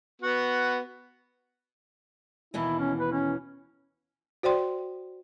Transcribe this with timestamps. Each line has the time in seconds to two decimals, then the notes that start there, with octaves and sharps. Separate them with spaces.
0.22 B3 F#4
2.54 D#2 B2 E3 E4
2.79 C#4
3.00 B4
3.12 C#4
4.43 F#4 C5 D5 G5 C6